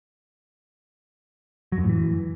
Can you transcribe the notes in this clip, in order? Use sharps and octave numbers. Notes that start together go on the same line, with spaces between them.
F#3
F#2
A2
E3